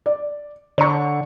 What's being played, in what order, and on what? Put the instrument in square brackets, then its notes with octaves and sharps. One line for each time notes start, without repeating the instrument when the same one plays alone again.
[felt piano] D5
[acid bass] D3 [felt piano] C#5 C#6